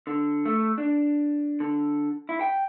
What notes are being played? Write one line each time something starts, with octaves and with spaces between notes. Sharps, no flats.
D3
A3
D4
D3
E4
G5